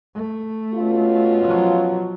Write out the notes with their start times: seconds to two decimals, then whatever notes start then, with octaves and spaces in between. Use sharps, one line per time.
0.15 A3
0.74 B2 C#4 F4
1.45 F3 F#3